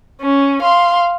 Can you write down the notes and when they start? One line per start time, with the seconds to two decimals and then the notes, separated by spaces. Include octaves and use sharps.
0.21 C#4
0.63 F5 C6